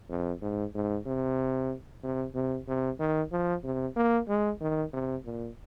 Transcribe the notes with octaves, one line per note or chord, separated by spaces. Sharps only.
F2
G#2
G#2
C3
C3
C3
C3
D#3
F3
C3
A#3
G#3
D#3
C3
A#2